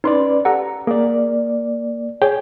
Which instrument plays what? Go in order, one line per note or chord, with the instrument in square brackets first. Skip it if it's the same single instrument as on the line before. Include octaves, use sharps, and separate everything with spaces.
[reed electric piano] C#4 B4 D5 [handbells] D#4 C6
[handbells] G4 A4 F#5 [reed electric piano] A#5
[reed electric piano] A#3 D5 [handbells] G#4
[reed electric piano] G#4 G5 [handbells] C#5